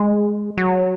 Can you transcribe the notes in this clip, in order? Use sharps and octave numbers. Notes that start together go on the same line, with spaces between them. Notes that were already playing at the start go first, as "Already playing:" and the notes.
Already playing: G#3
F#3